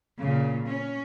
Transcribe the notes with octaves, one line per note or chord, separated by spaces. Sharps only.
A#2 C#3
C#4